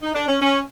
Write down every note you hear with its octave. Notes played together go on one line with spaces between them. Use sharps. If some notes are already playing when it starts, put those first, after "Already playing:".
D#4
D4
C#4
C#4